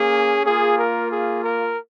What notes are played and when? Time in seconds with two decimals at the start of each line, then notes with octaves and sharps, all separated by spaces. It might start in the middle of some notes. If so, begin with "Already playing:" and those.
Already playing: A#3 C#4 G#4
0.46 A#3 F4 G#4
0.79 A#4
1.12 G#4
1.44 A#4